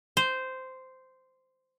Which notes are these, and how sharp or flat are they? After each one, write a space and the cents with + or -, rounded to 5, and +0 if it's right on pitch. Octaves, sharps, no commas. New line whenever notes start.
C5 -10